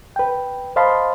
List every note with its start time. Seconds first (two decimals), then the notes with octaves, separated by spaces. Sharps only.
0.16 B4 G5
0.76 C5 D#5 F5 A5 B5 C6